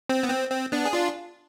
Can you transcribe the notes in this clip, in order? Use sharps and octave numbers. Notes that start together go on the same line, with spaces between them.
C4
B3
C4
C4
B3 D4
G#4
D4 F4